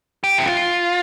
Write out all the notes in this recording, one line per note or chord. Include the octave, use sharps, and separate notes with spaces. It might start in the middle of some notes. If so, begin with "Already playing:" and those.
G4
E4
F4